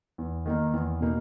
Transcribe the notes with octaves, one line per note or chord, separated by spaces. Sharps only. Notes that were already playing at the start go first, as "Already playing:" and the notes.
E2
D#3 A#3 D#4
E2
B2 A#3 D#4